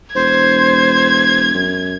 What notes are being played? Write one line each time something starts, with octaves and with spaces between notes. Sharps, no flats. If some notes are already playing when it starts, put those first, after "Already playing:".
E1 C5 G#6
F#2